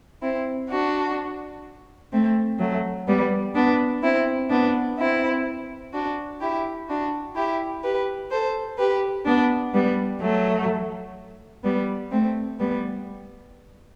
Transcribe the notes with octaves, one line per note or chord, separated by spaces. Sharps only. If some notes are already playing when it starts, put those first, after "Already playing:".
C4 E4
D4 F#4
A3 C4
F#3 A3
G3 B3
B3 D4
C4 E4
B3 D4
C4 E4
D4 F#4
E4 G4
D4 F#4
E4 G4
G4 B4
A4 C5
G4 B4
B3 D4
G3 B3
F#3 A3
G3 B3
A3 C4
G3 B3